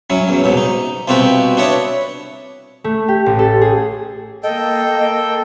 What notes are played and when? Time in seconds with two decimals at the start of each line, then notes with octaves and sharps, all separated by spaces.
0.10 F#3 C#4 E4
0.29 E2 F#3
0.44 C2 G#2 B2
0.57 D#4
1.08 C2 B2 C4 F4 F#4 B4
1.57 D4 E4 B4 C#5 D#6
2.84 A3
3.08 G4
3.26 A1
3.39 A4
3.61 G#4
4.43 A#3 A4 D#5 G5